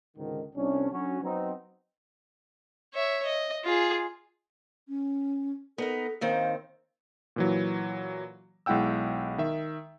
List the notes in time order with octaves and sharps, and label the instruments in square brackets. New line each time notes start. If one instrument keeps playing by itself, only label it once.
[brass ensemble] C#2 G#2 D3 D#3
C2 C#4 D4
D3 F#3 C#4 F#4
F#3 B3 C4 D#4
[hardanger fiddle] C#5 E5
D#5
F4 G#4
[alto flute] C#4
[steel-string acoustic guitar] B3 D#4 A#4 [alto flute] A4
[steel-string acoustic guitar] D#2 D#3 C4 [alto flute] F5
[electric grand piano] A#2 E3 F#3
B1 G#3 E4 F#5 G5 E6
D#3 E5